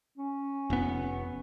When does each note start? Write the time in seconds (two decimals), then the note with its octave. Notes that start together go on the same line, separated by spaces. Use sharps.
0.18 C#4
0.70 F1 B3